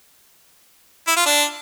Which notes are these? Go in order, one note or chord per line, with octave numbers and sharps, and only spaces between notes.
E4
F4
D4